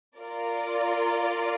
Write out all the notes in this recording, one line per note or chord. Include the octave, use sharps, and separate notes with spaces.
F4 A#4 D5